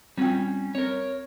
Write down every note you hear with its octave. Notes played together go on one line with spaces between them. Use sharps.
G3 C4 C#4 F4 G5
C4 A#4 C#5